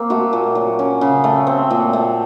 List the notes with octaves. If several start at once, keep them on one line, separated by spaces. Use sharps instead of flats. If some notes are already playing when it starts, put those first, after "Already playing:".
Already playing: A#3 C4
A3 F#4
A#2
F#3
C#4
C#3
A3
C4
A#2
A3